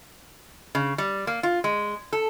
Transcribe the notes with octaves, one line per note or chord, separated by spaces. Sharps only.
C#3
G3
A#3
F4
G#3
A4